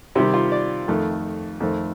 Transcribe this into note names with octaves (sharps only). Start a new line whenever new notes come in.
C3 D#3 G3 C4 G4
F4
D5
F2 D#3 A3
F2 D#3 A3 C4